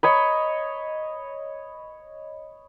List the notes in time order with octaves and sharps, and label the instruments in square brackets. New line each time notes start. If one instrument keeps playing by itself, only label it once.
[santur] C#5 D#5 B5